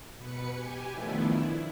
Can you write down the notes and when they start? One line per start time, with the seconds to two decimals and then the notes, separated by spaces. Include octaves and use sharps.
0.17 B2 B4 C#7
0.52 G4 G#5
0.92 D#3 F3 A3 B3 D4 E4
1.29 E4